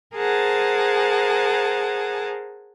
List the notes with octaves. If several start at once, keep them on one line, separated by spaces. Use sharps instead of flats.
G#4 A#4 C5 F#5 G#5 A5